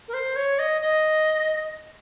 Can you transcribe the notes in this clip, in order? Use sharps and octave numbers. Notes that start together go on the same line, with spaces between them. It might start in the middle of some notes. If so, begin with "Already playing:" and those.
A#4
C5
C#5
D#5
D#5